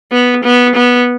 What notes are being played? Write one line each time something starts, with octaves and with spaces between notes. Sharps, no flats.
B3
B3
B3